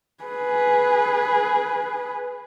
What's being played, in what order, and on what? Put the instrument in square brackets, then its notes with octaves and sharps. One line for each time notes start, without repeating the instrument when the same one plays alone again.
[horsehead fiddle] G#4 B4